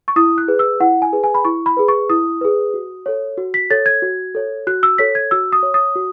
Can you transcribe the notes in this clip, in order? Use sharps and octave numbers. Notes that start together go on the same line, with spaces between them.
C#6
E4 D#6
F#6
G#4 B4
E6
E4 F#5
G#5
G#4 B4
G#5
B5
E4 C#6
B5
G#4 B4
C#6
E4 D#6
G#4 B4
F#4
A4 C#5
F#4
B6
A4 C#5 A6
G#6
F#4
A4 C#5
F#4 F#6
E6
A4 C#5 B6
G#6
F#4 E6
D#6
C#5
D#6
F#4